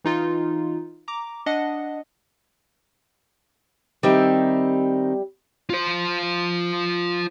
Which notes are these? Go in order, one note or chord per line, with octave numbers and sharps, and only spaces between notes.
E3 D#4 F4
A#5 D6
D4 D#5 F#5
D#3 G3 C4 D#4 E5
F4 C5